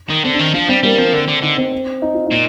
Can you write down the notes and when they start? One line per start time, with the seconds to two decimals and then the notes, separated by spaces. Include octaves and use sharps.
0.10 D#3
0.24 D3 C4
0.34 D4
0.39 D#3
0.54 F3 D4
0.68 G3 C4
0.83 G3 A#3
0.98 F3 C4
1.13 D3
1.28 D3
1.42 D3 D#4
1.58 C4
1.72 C4
2.02 D#4
2.14 F4
2.27 A#2 D#4